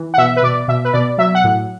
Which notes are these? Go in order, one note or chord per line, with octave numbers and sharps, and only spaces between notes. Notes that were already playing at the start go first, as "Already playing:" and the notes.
Already playing: E3
F#5
B2 E5
B4
B2 D5
B2 E5
B4
B2 D5
F#3 E5
F#5
A2